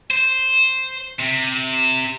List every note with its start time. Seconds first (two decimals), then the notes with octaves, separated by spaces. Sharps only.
0.11 C5
1.20 C3